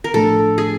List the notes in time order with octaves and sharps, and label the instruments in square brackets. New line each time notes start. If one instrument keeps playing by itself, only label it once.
[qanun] A#4
[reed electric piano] A2 F3 A3 D4 [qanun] A4
[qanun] G#4